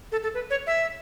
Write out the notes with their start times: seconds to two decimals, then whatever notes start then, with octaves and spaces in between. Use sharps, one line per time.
0.12 A4
0.23 A4
0.34 B4
0.50 C#5
0.67 E5